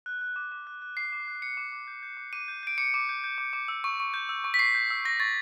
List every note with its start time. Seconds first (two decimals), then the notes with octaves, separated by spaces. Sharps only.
0.06 F#6
0.21 F#6
0.36 D6
0.52 D6
0.67 F#6
0.82 F#6
0.97 D6 C7
1.12 D6
1.28 F#6
1.42 F#6 C#7
1.57 D6
1.72 D6
1.87 G6
2.03 G6
2.17 D6
2.33 D6 D#7
2.48 G6
2.63 G6 D7
2.78 D6 C#7
2.94 D6
3.09 G6
3.24 G6
3.38 D6
3.53 D6
3.68 E6
3.84 C#6
4.00 C#6
4.14 G6
4.29 E6
4.44 C#6
4.54 B6
4.59 C#6 C7
4.75 G6
4.90 E6
5.05 C#6 A#6
5.20 C#6 A6